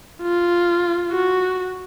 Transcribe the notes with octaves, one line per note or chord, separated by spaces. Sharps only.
F4
F#4